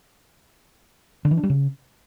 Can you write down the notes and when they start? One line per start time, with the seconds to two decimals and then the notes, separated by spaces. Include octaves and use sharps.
1.25 D3
1.31 E3
1.37 D4
1.43 G3
1.50 C#3